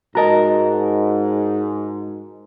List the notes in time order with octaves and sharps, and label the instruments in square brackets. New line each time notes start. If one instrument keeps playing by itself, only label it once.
[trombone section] G#2 [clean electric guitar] F#4 A#4 [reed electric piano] D#5 A5 A#5